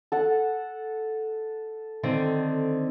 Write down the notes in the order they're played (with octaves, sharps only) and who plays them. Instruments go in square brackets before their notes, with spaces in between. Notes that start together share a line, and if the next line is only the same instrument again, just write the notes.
[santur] A4 F#5
[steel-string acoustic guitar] D3 D#3 C4